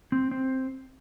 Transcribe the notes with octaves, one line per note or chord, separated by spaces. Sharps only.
C4
C4